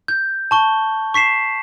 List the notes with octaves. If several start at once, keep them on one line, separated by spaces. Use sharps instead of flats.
G6
A5 C#6 G7
C#6 B6 C7 E7